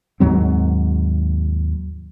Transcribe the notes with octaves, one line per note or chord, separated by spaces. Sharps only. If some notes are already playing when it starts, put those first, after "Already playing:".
D#2 G#2 F#3 C4